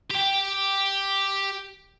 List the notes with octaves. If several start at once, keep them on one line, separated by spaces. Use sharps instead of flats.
G4 G5